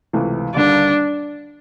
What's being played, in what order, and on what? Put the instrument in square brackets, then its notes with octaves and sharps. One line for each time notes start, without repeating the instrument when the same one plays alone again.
[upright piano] C#2 C3 E3 A3
[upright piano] D#2 D3 G3 A#3 [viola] D4